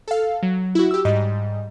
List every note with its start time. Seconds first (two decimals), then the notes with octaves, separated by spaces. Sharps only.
0.08 A4 F5
0.43 F#3
0.75 E4 F#4
0.91 G4 E6
1.05 G#2 G3 D#5